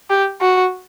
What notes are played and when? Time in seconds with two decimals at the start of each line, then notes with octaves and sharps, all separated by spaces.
0.10 G4
0.41 F#4